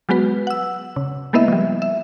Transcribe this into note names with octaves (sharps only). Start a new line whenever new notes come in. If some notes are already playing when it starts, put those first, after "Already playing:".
F#3 G#3 B3 F#4 B4
F#5 E6
C#3
G#3 A#3 B3 E4 D#5 E5
F3 G3
E5